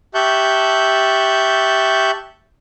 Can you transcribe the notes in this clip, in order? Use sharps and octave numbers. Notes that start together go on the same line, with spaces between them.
G4 E5 A5 C#6 F#6 G6